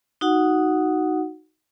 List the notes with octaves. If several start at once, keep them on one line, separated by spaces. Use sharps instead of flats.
D#4 F#4 F#5